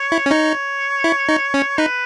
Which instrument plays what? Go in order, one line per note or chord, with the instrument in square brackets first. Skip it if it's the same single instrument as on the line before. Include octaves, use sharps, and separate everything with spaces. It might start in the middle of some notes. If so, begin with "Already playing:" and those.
Already playing: [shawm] C#5
[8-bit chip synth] E4
C#4
[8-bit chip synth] D#4 [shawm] C#5
[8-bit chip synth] E4
D#4
C#4
[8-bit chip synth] D#4 [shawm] B4